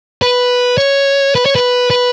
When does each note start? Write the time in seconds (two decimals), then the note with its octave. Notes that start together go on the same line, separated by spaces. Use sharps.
0.22 B4
0.78 C#5
1.35 B4
1.46 C#5
1.55 B4
1.90 B4